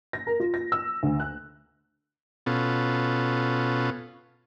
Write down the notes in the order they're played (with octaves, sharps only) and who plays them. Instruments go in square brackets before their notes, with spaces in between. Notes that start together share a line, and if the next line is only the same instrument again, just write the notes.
[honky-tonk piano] A#6
A#4
F4
A#6
E6
D2
F#6
[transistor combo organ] B2 B3 C#4 F4 A4